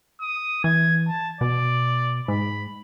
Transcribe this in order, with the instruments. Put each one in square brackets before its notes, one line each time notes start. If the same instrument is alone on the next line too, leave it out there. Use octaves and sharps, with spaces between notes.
[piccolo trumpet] D#6
[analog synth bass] E3 [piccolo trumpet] G#6
[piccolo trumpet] A5
[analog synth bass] B2 [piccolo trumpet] D5
[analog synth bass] G#2 [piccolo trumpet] B5